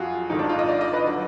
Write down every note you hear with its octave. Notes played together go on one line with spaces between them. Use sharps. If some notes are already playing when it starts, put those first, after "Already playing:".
Already playing: F2 F#3 F4 F#4 G#4
G#1 G#2 D#3 D#4
D4
F4
D#5
D5
D#5
B4
D3 F#3